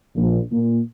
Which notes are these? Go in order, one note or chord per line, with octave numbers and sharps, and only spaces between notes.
A#1
A#2